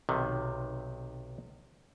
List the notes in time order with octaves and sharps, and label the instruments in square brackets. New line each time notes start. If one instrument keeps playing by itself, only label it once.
[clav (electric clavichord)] B1 C3 D#3